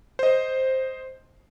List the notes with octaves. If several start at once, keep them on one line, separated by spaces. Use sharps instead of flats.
C5 D#5